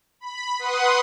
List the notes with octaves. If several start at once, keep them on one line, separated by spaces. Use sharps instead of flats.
B5
B4 F#5 C6 D#6